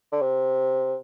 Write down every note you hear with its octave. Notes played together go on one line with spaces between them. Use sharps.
D3
C3